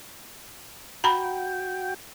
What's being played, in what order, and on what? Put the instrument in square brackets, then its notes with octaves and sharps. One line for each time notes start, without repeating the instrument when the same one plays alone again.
[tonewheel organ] F#4 G5 [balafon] A#5 B5